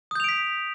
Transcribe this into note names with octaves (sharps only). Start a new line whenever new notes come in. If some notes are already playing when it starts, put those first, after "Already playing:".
D#6 G6 B6 D7 F7